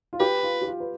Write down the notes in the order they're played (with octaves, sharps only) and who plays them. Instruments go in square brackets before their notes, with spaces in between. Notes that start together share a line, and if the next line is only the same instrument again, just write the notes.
[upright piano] F4
[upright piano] G4 [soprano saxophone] B4
[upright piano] F4
G4
F4
B4